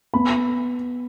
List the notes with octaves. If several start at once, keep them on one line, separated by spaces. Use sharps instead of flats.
B3 B5